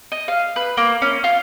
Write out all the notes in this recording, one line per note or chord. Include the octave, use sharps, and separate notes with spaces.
D#5
F5
B4
A#3
C#4
F4